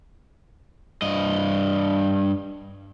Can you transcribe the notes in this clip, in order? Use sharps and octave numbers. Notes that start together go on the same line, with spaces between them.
G2 D#5